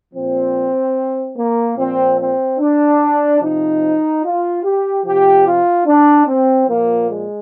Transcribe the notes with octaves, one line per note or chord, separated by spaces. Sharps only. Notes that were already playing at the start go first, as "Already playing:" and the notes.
A#2 F3 C4
A#3
A#2 F3 C4
C4
D4
C3 F3 D#4
F4
G4
C3 F3 G4
F4
D4
C4
A#2 F3 A#3
G#3